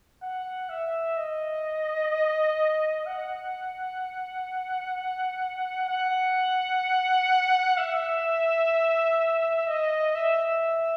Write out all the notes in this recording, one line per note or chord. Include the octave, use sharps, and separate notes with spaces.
F#5
E5
D#5
F#5
F#5
E5
D#5
E5